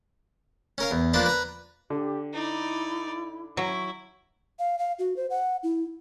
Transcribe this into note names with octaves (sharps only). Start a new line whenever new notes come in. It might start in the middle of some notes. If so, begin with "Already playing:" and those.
C#4 A#4 F5
E2
F3 A#3 D4 B4 C5
B4 A#5
D3 G4
D#4 E4 D5
F#3 E4
F5
F5
F#4
C5
F#5
E4